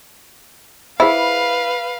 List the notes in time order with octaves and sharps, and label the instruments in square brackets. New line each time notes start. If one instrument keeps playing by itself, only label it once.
[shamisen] E4 [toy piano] G#4 C5 B5 [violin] B4 F5